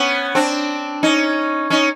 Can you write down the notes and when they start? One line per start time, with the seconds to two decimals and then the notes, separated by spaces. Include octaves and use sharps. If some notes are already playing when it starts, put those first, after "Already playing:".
Already playing: B3 C#4
0.35 C4 D4
1.03 C#4 D#4
1.70 C#4 D#4